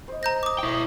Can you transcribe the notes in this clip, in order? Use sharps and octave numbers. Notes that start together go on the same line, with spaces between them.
C5 D#5
A#5 G6 A#6
D6 D#6
E4 G5